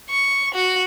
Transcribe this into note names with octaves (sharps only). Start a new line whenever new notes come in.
C#6
F#4